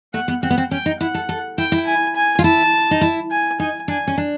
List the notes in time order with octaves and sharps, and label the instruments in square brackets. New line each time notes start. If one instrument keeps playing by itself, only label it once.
[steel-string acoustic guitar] A3 [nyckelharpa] F#5
[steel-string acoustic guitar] B3
[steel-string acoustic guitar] C4 [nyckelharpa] F#5
[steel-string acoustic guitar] B3
C4
[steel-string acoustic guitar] C#4 [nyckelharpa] G5
[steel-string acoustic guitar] D#4
[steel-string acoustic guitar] E4 [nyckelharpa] F#5
[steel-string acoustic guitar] A4
A4
[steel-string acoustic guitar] E4 [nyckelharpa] G5
[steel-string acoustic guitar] E4
[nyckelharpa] G#5
G#5
[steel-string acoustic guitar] F4
[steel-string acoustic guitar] E4 [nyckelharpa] A5
[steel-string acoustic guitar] D#4
E4
[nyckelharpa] G#5
[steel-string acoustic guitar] D#4 [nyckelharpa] G#5
[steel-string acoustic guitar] D4 [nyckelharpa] G#5
[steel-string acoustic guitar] C#4
D4